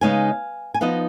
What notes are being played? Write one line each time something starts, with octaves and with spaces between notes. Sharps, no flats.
C#3 G#3 B3 D#4 F5 G#5
G#5
F3 B3 D#4 D#5 F#5